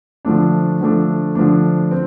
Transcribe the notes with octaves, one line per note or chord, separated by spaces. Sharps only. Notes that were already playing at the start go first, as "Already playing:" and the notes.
D3 F3 A3 D4
D3 F3 A3 D4
D3 F3 A3 D4
C4